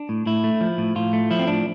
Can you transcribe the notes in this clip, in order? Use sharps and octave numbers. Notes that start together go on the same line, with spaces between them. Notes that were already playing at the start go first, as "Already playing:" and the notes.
Already playing: D4
A2
A2 E4
A3
F3
A2
A2 F4
A3
F3 E4
C4
A2 D4